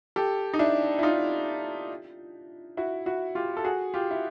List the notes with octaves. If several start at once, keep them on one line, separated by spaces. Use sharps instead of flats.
G4 A4
D#4
D4 E4
E4
D#4 F4
E4 F#4
E4 F#4
F4 G4
A4
F#4 G#4
F4 G4
E4